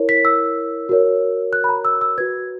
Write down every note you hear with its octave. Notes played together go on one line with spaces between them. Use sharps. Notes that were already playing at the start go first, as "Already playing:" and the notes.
Already playing: E4 A#4 C#5
B6
E6
F#4 A#4 C#5
F#6
B5
A#5
E6
E6
F#4 B4 G#6